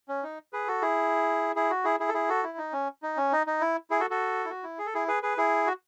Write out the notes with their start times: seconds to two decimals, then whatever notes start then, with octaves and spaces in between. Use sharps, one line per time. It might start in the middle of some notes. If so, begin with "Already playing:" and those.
0.08 C#4
0.23 D#4
0.53 G#4 B4
0.67 F#4 A4
0.82 E4 G#4
1.56 E4 G#4
1.70 F#4
1.84 E4 G#4
2.00 E4 G#4
2.09 A4
2.14 E4 G#4
2.29 F#4 A4
2.44 E4
2.58 D#4
2.73 C#4
3.03 D#4
3.17 C#4
3.32 D#4
3.47 D#4
3.61 E4
3.90 E4 G#4
4.00 F#4 A4
4.10 F#4 A4
4.45 E4
4.49 F#4
4.63 E4
4.79 G#4
4.86 A4
4.94 E4 G#4
5.08 G#4 B4
5.23 G#4 B4
5.38 E4 G#4
5.67 F#4